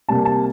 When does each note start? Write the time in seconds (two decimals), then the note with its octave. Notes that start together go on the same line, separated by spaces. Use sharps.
0.09 C3 G3 A#3 A5
0.25 A5